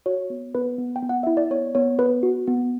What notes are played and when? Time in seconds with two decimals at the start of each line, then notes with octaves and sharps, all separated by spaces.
0.06 F#4 C#5
0.30 B3
0.55 B3 B4
0.78 B3
0.96 G5
1.02 B3
1.09 F#5
1.23 E4 E5
1.37 D5
1.51 B3 C#5
1.75 B3 C#5
1.99 B3 B4
2.23 F#4
2.47 B3